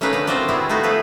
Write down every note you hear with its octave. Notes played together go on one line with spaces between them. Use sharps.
A3 C#4 D#4 A#4 B4 F5
D3 B4 F5
C4 F4 F#4 A#4 C5 D5
G3 B3 E4 F#4 G#4
A3 D#4 F4 F#4
F3 G#4 A4 B4